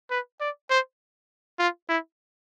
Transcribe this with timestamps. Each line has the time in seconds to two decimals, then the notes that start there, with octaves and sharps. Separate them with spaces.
0.11 B4
0.40 D5
0.70 C5
1.59 F4
1.89 E4